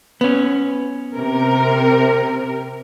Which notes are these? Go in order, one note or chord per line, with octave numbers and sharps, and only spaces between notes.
B3 C#4
C3 A#4